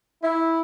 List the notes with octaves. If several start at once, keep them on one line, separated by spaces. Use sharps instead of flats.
E4